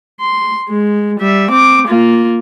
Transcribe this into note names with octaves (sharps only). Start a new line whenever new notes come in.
C6
G#3
G3 E5
C4 D6
A#3 F4